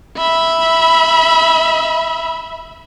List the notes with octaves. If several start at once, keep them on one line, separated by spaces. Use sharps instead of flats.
E5 B5